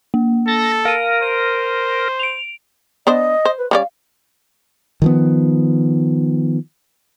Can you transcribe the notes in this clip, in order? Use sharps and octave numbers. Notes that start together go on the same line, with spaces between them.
A#3
A4 A6 A#6
A#4 F5 D#7
C5 D#7
D7 F7
B3 D4 C5 D#5
C5
B4
G3 C#4 D5 F5
D#3 F3 B3